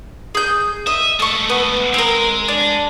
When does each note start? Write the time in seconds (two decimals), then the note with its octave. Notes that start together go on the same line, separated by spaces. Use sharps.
0.35 G#4 G6
0.87 D#5 E5
1.20 G#3 A3 A4 C#6
1.50 B3
1.94 G#3 C4 A#4
2.48 D4